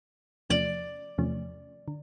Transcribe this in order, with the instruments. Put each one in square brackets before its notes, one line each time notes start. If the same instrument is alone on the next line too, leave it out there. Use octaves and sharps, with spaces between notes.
[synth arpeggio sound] E2 C3 F3 A3 C#4 [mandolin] D5
[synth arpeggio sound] E2 C3 F3 A3 C#4
D3